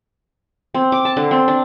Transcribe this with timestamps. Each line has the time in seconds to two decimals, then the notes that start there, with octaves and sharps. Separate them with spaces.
0.74 C4
0.92 D6
1.05 A5
1.17 D3
1.31 C4
1.48 D4